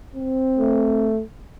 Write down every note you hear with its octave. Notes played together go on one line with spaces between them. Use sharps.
C4
A3